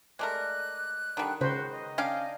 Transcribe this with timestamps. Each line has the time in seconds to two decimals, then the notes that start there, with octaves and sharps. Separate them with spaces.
0.19 G#3 A3 A#4 D5 F#6
1.17 D3 D#3 G3
1.41 C#3 F#4 B4 C5
1.71 D#5
1.98 C#4 D4 F5 G5